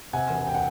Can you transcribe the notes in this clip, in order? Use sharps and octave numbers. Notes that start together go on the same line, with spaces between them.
C3 F#5 G#5
E1
G5
F#5